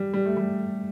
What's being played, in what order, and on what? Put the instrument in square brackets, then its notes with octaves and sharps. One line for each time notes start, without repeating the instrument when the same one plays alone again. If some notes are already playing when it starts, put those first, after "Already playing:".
Already playing: [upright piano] G3
G3
A3
G3